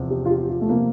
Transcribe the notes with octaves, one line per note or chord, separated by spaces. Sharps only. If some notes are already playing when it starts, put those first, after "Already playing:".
Already playing: E2 C3 F3
G4
F4
G4
F4
A3
C3 F3 A#3